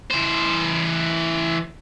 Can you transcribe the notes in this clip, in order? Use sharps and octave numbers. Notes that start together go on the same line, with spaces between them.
E3 C5